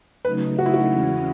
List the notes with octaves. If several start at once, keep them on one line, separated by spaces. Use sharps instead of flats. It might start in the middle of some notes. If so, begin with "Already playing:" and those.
C#3 F#3 A3 D#4 B4
F#4
E4
F#4
E2 C#3 E3 G#3 C#4